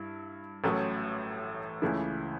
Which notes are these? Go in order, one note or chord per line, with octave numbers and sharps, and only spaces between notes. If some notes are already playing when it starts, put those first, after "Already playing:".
Already playing: G2 E4
A1 A2 F#3 A3 C#4
C#2 C#3 E3 A3 E4